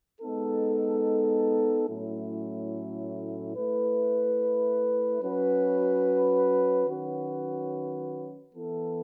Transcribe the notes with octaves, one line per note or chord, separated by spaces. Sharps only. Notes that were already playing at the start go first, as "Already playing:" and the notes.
G#3 B3 D#4 A4
A2 F#3 A3 C#4 E4
A3 E4 B4
F#3 C#4 F#4 B4
D#3 F#3 C#4 F#4 B4
E3 B3 E4 A4